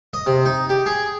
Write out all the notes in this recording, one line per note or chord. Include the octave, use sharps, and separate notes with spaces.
D#5
C3
D#4
G4
G#4